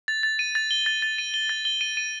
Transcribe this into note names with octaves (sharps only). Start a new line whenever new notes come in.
A6
A6
D#7
A6
G7
A6
A6
D#7
G7
A6
G7
D#7
D#7